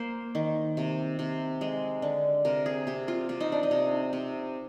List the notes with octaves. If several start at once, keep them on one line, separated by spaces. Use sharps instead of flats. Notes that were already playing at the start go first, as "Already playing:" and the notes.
Already playing: A#3 C5
D#3
C3
C3
G#3
D3
C3 A#4
G#4
C3 G4
F4
C3 F4
D#4
D4
D#4
C3
C3